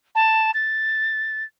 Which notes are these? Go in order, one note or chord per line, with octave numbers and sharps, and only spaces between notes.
A5
A6